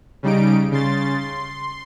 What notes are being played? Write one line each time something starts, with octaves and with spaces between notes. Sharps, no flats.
C#3 G3 D#4 D7
C#3 C6 A6
C6